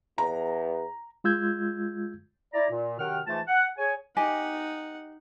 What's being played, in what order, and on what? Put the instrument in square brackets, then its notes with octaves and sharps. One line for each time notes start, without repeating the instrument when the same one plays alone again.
[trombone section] E2 [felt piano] A#5
[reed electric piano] G#3 F4 E6 G6 G#6
[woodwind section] E4 D5 A#5
A#2
F#2 C3 D#3 F#5 G5 F6
G#2 E3 A3 F4 A5
F#5
G#4 C#5 G#5
[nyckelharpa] D#4 F#5 [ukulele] G4 D#5 G#5